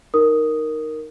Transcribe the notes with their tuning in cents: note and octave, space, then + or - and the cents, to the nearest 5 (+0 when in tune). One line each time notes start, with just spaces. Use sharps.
D#4 +0 A#4 +0 D#6 +0